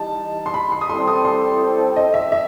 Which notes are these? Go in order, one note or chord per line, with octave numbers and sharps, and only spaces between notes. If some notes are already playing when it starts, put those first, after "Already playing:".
Already playing: E3 G3 D#4 A5
C6
B5
C6
D#6
G3 C4 E4 A4 C5 C6
D#6
C6
D#5
E5
E5